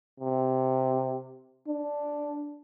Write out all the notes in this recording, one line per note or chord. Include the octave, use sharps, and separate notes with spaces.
C3
D4